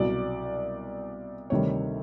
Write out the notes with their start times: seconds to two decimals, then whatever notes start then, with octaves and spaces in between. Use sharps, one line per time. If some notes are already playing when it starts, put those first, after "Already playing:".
Already playing: C2 B2 F#3 D5
1.50 D2 C3 D#3 G3 C#5